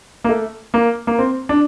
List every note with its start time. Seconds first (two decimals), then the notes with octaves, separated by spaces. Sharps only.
0.24 A#3
0.29 A3
0.74 A#3
1.07 A#3
1.19 C4
1.49 D4